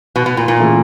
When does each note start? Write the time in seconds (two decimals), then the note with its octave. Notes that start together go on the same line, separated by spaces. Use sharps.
0.16 B2
0.26 B2
0.37 A#2
0.48 A#2
0.59 C#3 E3 A3